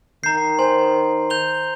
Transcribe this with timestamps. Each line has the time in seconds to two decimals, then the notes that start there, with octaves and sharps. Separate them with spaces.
0.24 D#3 A#5 G6 C7
0.59 C5 G#5 C6
1.30 G6 F7 G7